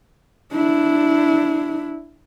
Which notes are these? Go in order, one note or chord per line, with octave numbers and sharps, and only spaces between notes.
D4 E4